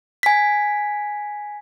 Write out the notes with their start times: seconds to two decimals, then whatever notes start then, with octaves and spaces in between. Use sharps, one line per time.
0.23 G#5 B6